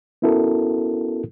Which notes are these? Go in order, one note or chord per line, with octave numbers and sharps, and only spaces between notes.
B3 C#4 E4 F#4 A4 A#4